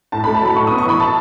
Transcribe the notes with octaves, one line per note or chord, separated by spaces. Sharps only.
A2 A5
B5
A3
A5
F#3 B5
A2 C#6
D#6
B3
C#6
E3 B5
A5